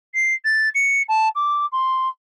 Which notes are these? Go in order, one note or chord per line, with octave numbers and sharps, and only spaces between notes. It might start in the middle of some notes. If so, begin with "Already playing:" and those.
C7
A6
C#7
A5
D6
C6